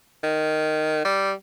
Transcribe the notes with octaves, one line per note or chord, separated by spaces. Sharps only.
D#3
G3